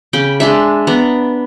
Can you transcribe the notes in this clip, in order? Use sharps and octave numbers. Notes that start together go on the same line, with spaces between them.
C#3 G5 B5 D6
G#3 D4 E5
B3 D4 A#5